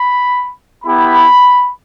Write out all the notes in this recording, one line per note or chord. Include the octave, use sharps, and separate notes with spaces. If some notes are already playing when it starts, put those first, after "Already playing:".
Already playing: B5
B3 E4 G4 B5